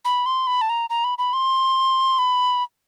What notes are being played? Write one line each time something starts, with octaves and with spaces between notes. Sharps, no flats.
B5
C6
B5
A5
A#5
A#5
B5
B5
C6
B5